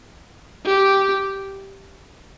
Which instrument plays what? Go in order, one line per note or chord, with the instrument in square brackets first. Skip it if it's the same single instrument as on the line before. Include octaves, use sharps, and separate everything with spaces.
[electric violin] G4